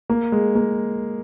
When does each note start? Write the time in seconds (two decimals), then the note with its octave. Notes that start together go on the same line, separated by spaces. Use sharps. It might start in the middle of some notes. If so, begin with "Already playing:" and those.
0.10 A#3
0.32 G#3
0.55 A#3